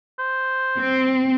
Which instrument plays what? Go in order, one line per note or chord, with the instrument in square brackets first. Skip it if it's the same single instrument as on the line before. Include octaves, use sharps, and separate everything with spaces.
[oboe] C5
[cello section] C4